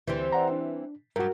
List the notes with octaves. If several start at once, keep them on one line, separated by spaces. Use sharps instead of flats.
D2 E3 G3 C4
D5 F#5 A#5
D4
G2 F#3 F#4 A#4